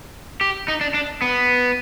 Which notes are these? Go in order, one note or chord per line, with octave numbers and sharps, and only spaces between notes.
G4
D#4
D4
D4
B3